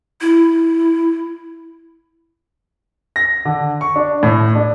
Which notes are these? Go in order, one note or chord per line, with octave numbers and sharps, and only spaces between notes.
E4
A#6
D3
C#6
D4
A2
D4